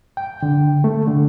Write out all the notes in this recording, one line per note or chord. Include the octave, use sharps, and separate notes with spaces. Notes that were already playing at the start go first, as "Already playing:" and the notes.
G5
D3
A3
D3